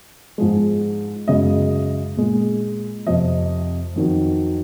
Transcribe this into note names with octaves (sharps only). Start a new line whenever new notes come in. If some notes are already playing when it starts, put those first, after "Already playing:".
G#2 F3 G#3
F#2 C#3 G#3 D#5
A#2 G#3
F2 C3 F3 D#5
F2 D#3 F#3